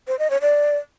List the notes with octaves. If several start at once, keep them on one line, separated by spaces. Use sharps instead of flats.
C5
D#5
C#5
D5